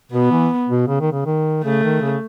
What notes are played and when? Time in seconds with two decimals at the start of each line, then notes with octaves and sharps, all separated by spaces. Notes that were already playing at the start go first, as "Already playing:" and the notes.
0.12 B2 B3
0.31 E3
0.69 B2
0.88 C#3
1.00 D#3
1.13 C#3
1.26 D#3
1.64 C#3 A3
1.83 D#3
2.02 C#3